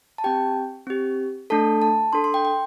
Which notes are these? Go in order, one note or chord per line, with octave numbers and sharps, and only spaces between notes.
A5
C4 G4 G5
C4 G4
A3 D4 A4 A5
A5
D4 A4 C6
C6
G5
G5